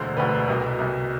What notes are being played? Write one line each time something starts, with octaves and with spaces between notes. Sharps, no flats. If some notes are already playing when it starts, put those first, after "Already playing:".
Already playing: E1 D2 D3 C5
E1 D2 D3 B4
C2 B2 A#4
C2 B2